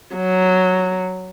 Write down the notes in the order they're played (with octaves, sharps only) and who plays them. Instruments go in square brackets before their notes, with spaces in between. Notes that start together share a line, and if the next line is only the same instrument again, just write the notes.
[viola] F#3